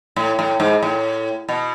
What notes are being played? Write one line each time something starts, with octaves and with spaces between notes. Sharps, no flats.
A2
A2
G#2
A2
B2